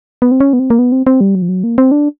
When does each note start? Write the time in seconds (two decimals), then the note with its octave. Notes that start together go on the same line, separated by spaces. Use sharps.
0.22 B3
0.31 C4
0.40 C#4
0.53 B3
0.59 C4
0.70 A#3
0.79 B3
0.92 C4
1.07 C4
1.21 G3
1.35 F#3
1.42 F3
1.49 F#3
1.64 A#3
1.78 C4
1.91 D4